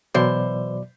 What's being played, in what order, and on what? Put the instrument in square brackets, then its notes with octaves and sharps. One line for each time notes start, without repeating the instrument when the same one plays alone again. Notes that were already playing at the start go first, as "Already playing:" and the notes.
[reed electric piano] B2 F#3 D5 [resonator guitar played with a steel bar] E3 C5